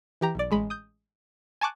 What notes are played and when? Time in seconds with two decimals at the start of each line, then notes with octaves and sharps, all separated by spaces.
0.21 E3 G4 A#5
0.35 B1 D5
0.51 A1 G#3 B5
0.70 D#6 G6
1.61 G#5 A5 C#6 D6 F#6